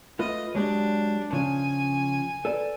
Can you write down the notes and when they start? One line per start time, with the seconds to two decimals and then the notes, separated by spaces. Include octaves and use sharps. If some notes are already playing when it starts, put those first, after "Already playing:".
0.19 A3 F4 B4 D#5
0.55 F#3 G#3 D4 G4
1.33 C#3 F3 G#5
2.45 A4 B4 D5